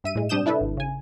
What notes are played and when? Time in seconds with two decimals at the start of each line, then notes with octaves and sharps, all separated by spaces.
0.04 G2 E5 D#7
0.15 A2 G#3
0.29 C3 G3 D4 D#6 G6 E7
0.46 D4 E4 A4 B4
0.61 G#1
0.77 C#3 G#5